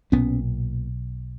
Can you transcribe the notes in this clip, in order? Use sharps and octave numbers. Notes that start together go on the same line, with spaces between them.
B1 A#2 B3 C#4